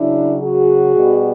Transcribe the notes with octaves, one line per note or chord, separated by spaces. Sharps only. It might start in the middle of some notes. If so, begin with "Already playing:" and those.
Already playing: C#3 F#3 D4 E4
F#4 G#4
B2 G3